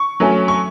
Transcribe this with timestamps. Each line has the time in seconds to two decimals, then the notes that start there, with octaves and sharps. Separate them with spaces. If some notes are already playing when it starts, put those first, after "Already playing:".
Already playing: C#6
0.20 F#3 A3 C#4
0.48 C#6